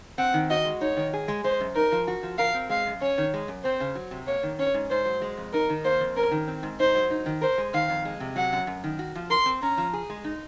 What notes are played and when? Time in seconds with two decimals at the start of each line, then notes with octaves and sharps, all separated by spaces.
0.18 C4 F#5
0.34 D#3
0.50 F#4 D#5
0.65 G#3
0.81 D#4 C#5
0.97 D#3
1.13 G#4
1.28 G#3
1.44 G#3 C5
1.61 F#2
1.75 D#4 A#4
1.92 F3
2.07 F#4
2.23 F3
2.38 A#4 F5
2.54 C4
2.70 G#3 F5
2.86 F#2
3.01 C#4 C#5
3.18 D#3
3.34 G#3
3.48 F#2
3.64 C4 C5
3.80 C#3
3.95 F#3
4.11 C3
4.27 A#3 C#5
4.43 D#3
4.59 C#4 C#5
4.74 G#2
4.90 G#2 C5
5.06 F#3
5.22 G#3
5.37 F2
5.53 D#4 A#4
5.70 D#3
5.84 A#3 C5
6.01 F2
6.16 C#4 A#4
6.31 D#3
6.48 C4
6.63 G#2
6.80 D#4 C5
6.95 F#3
7.11 D#4
7.26 D#3
7.41 A#4 C5
7.58 G#3
7.74 D#3 F5
7.90 F2
8.05 G#3
8.20 C3
8.36 F#3 F#5
8.53 F#2
8.67 F#2
8.84 D#3
8.99 F#4
9.15 F3
9.30 A#4 C6
9.46 C4
9.62 C#4 A#5
9.78 F3
9.93 G#4
10.10 G#3
10.24 D#4